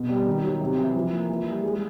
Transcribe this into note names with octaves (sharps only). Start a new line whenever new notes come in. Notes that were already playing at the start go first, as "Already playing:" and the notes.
Already playing: B2
G3
D#3
F#3
C3
E3
F3
A#3
E3
G3
G#3